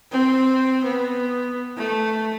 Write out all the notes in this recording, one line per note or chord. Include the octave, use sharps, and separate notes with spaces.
C4
B3
A3